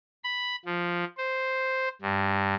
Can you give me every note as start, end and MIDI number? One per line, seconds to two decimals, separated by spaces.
0.24 0.56 83
0.66 1.04 53
1.17 1.88 72
2.02 2.55 43